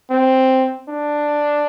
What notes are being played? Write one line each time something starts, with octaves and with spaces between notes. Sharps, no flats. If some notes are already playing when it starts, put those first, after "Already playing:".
C4
D4